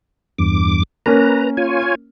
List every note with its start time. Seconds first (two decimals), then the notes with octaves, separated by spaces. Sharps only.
0.38 E2 G2 D6
1.06 A#3 C#4 B4 A#5
1.57 F4 C#5 G#5